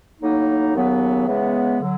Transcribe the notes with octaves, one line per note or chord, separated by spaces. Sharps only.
A2 F#3 A#3 D#4
D#2 C#3 F#3 B3
C#3 E3 G#3 B3
D3 F#3